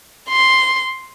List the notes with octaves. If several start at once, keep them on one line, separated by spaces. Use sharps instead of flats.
C6